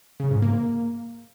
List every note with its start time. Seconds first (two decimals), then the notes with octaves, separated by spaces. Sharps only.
0.20 C#3
0.31 G#2
0.42 A#3